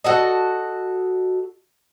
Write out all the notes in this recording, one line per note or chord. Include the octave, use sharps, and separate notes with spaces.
F#4 A4 D#5